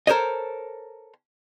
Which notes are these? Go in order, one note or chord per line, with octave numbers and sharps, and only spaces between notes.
A4 A#4 C5 C#5 D#5